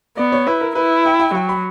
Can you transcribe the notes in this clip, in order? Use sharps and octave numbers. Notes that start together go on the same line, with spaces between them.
B3 D5
C#5
E4 B4
A#4
E4 B4
G5
G5
F#3 G5
B5